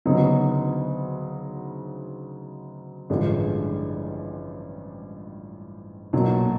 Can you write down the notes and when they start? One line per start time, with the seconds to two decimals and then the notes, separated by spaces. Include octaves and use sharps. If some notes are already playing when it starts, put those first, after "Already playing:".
0.06 D2 C#3 F#3 B3 D#4
3.10 A1 G2 D3 F3 G#3
6.13 B1 A#2 F#3